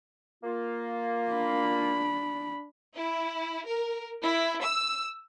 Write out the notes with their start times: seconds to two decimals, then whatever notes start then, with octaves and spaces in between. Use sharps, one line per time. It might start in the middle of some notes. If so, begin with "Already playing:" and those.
0.43 A#3 F4
1.31 D4 B5
2.95 E4
3.66 A#4
4.21 E4
4.62 E6